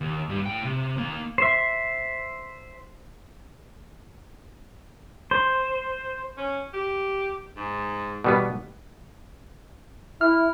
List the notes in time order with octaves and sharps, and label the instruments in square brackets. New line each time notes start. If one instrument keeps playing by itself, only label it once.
[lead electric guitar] D#2
G2 G3
A2 G5
C3
D#2 A#3
[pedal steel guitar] C5 E5
C5
[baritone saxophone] C#4
G4
G#2
[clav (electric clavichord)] B2 G3 B3
[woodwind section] E4 [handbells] F6